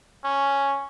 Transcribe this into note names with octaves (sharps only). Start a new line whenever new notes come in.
C#4